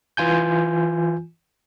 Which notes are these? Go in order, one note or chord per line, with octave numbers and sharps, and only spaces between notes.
E3 F4 G#5 G6